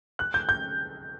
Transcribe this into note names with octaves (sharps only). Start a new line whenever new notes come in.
F#6
G6
G6